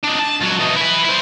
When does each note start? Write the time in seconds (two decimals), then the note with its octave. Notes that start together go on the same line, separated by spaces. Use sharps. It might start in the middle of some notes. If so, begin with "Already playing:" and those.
0.04 D4 D#4
0.20 A5
0.42 C#2 F#3
0.60 E3 D#4
0.77 E4 B4
1.05 E4 C5